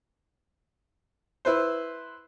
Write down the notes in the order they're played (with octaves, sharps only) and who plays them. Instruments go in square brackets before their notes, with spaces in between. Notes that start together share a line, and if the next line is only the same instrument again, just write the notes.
[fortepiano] E4 B4 C5